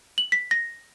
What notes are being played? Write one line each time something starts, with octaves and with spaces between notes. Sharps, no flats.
F#7
B6
A#6